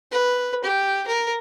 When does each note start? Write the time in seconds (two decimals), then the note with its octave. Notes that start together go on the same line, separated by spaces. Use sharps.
0.11 B4
0.64 G4
1.07 A#4